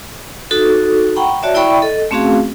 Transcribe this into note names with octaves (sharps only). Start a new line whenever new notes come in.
D#4 F#4 A4
F#5 G5 A#5 B5 C#6
F#4 C#5 D5 E5 A5
E4 D5 E5 G5 B5 C#6
A4 D#5
A3 C4 C#4 F#4 G#4 F5